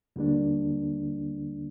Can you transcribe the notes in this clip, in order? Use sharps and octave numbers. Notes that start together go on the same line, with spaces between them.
D#2 D3 G3 A#3 D4